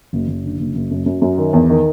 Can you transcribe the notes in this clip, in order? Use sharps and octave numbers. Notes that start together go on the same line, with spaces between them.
F#1
F#1
D3
F#1
F#1
F#2
F#2
F#2
D#3
E2
D#3